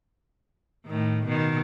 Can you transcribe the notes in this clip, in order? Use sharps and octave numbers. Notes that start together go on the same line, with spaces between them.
A2 D#3
B2 D#3